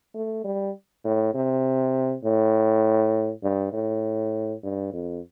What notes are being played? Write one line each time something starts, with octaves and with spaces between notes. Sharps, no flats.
A3
G3
A2
C3
A2
G2
A2
G2
F2